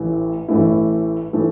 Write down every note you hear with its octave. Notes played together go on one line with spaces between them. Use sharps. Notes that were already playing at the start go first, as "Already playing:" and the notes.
Already playing: A1 A2 E3 A3 E4
A1 A2 E3 A3 E4
A2 E3 A3 E4